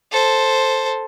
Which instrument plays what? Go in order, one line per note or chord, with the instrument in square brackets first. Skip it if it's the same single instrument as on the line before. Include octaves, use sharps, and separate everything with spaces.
[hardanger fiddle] A4 C5